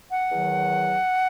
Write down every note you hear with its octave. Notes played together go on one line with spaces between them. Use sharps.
F#5
E2 D#3 F#3